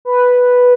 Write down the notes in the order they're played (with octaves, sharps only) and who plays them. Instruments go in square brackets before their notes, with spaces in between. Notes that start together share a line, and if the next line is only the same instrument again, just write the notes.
[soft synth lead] B4